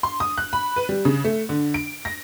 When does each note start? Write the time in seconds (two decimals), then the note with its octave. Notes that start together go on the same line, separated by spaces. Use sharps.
0.03 C6
0.20 D#6
0.38 F#6
0.53 B5
0.76 B4
0.89 G3
1.05 C#3
1.24 A3
1.49 D3
1.74 D7
2.05 A#6